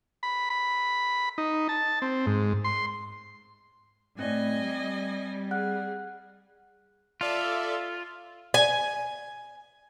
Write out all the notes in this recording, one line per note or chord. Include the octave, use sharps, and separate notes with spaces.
B5
B5
D#4
A5
C4
G#2
C6
A2 C4 D5 D#5 G#5
G3
G#4 F#5 F6 F#6
F4 A4 D5 E5
G#5